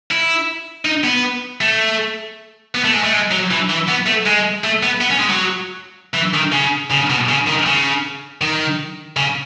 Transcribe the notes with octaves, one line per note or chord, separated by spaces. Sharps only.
E4
D#4
B3
A3
B3
A3
G#3
A3
G#3
F#3
E3
E3
B3
A3
G#3
A3
B3
B3
C#4
G#3
F#3
E3
D#3
C#3
C#3
B2
C#3
D#3
C#3
D#3
C#3